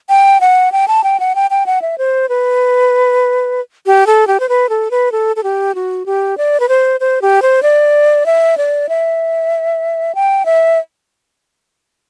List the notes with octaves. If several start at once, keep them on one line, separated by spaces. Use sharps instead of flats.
G5
F#5
G5
A5
G5
F#5
G5
G5
F#5
E5
C5
B4
G4
A4
G4
C5
B4
A4
B4
A4
A4
G4
F#4
G4
D5
B4
C5
C5
G4
C5
D5
E5
D5
E5
G5
E5